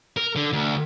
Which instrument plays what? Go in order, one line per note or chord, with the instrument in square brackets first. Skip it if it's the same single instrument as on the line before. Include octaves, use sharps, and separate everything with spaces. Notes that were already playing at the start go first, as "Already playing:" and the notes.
[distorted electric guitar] A#4
D3
D2